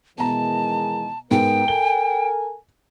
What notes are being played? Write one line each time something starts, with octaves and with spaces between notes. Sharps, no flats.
B2 D#3 E3 G#3 A5 A#5
G#2 B3 A#4 G5
A4 A#4 G#5 G7